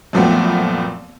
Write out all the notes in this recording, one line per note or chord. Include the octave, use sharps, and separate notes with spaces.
F#2 A#2 F3 A3 B3 C4